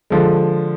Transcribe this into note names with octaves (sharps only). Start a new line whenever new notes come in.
D3 F3 G#3